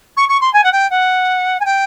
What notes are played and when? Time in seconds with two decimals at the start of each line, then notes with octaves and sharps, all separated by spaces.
0.17 C#6
0.29 C#6
0.41 C6
0.53 G#5
0.64 F#5
0.72 G5
0.90 F#5
1.60 G#5
1.65 G5